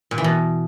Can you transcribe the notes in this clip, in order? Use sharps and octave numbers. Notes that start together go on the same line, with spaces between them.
A#2
E3
B2